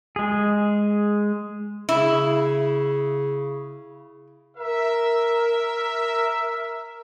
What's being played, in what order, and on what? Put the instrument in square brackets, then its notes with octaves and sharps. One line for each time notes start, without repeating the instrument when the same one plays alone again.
[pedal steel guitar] G#3 G#4
[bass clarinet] C#3 [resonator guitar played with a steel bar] E4
[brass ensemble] A#4 E5